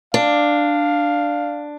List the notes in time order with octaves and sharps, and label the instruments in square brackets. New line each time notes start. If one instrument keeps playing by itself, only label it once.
[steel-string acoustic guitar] D4 [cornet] F5